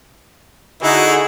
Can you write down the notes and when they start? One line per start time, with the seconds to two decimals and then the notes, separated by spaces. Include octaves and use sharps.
0.82 D3 D#4 E4 F#4 G#4